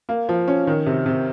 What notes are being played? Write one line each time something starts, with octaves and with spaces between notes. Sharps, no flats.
A#3
F3
C#4
D#3
C3
C3